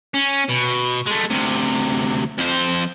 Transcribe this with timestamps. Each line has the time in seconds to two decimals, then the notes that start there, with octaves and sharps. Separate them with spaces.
0.14 C#4
0.49 B2
1.06 G#3 A3
1.30 D2 C3
2.38 F2 C5